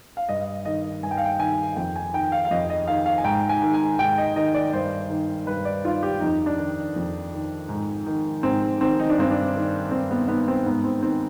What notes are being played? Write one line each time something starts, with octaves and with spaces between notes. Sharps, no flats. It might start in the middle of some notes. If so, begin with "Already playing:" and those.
F5
G2 D#5
D#3 D#5
G2 G#5
G5
F5
G5
D#3 G#5
F2 G5
G#5
D#3 G5
F5
F5
F2 D#5
D#5
D#3 F5
F5
G#5
G#2 G5
G#5
D#3
G#5
G#2 G5
D#5
D#3 D#5
D5
G2 C5
D#3
G2 B4
D5
D#3 F4
G4
F2 D#4
D4
D#3
F2
D#3
G#2
D#3
G#2 C4
D#3 C4
D#4
D4
G2 C4
D4
D#3
G2 C4
B3
D#3 B3
C4
G#2 B3
C4
D#3 C4